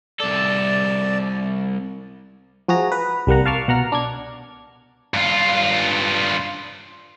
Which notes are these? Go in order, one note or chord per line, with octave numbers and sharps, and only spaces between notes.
C2 A4 D5
F3 F#4 G#4 A#5
B4
C2 G3 A#3 F#5 A#5
F5 A5 C#6 D6 F6
B2 F#5 A#5 F6
D4 D5 G#6
G2 F4